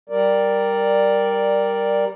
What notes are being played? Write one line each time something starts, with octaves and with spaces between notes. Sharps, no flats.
G3 A#4 D5